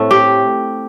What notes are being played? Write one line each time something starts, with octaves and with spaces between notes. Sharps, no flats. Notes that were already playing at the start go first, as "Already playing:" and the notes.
Already playing: A2 A3 C4
G4